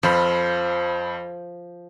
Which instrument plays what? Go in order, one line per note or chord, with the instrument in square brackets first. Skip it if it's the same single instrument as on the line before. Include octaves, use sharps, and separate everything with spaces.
[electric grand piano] F2 C5 B5 [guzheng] F3